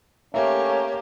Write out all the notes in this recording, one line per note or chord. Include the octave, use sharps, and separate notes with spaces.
A3 A#3 C#4 G4 C#5 E5